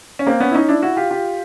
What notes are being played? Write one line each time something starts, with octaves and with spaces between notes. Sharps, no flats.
C#4
A#3 C4
B3 C#4
E4
C#4 D#4
D4 E4
E4 F#4
F4 G4
F4 G4